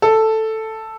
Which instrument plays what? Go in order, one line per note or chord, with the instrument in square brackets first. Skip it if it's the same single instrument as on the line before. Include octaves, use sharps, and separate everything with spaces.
[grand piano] A4